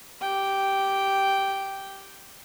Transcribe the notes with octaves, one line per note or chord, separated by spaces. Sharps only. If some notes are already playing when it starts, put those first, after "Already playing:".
G4 G5